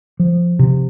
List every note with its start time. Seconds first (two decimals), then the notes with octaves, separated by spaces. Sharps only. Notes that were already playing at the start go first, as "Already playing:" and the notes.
0.19 F3
0.59 C3